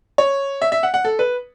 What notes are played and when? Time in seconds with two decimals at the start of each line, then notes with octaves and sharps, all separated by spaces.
0.18 C#5
0.62 E5
0.72 E5
0.83 F#5
0.94 F#5
1.05 A4
1.19 B4